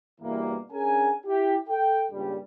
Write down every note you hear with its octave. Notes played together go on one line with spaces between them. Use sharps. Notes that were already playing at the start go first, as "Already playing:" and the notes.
E2 G2 B2 E3 G3 A#3
C#4 D4 G#4 A#4 G#5
E4 G4
A4 G5
C#2 G2 A#2 G3